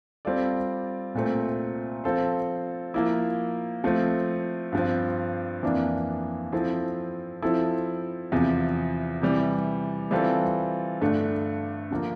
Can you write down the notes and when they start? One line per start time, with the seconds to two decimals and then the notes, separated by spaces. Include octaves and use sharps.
0.25 G3 C4 F4 A4 D5
1.14 C2 A#2 A3 C4
2.04 F3 C4 F4 A4 C5
2.94 F3 A#3 E4
3.84 F3 A3 C4
4.72 G2 F3 C4
5.63 F2 E3 A#3 D4
6.52 F3 C4 E4 A4
7.42 F3 C4 E4 A4
8.32 E2 C3 F3
9.22 C3 E3 G3
10.11 E3 G3 C4 F4 A4
11.01 G2 D3 A3 D4
11.91 D3 F3 A#3